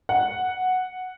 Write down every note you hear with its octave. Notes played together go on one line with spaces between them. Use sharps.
F#5